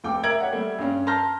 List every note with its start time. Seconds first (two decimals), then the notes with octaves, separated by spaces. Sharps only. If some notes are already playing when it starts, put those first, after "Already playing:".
0.04 F1 G5 D6
0.23 A#4 E5 A#5 G#6 D7 F#7
0.40 G4 C#5 F#5
0.53 G3 A3
0.79 G2 C#4
1.07 A5 A#5 C6 F6 G6 A#6